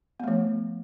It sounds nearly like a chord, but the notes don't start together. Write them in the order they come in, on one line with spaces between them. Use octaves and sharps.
B3 A3 F3